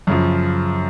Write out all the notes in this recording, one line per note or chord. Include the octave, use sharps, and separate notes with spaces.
F#2 C#3 F3